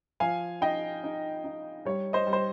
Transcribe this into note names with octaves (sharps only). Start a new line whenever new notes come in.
F3 F5 G#5
D#4 D#5 G5
D#4
D#4
G3 C#5
C5 D#5
G3
C5